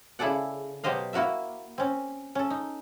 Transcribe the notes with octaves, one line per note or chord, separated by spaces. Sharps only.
C#3 E4 G#4 A4 D5 F#5
B2 F#3 G4 C5 D#5 F5
A#3 E4 F#4 A#4 E5
C4 C#4
C#4 A4
D#4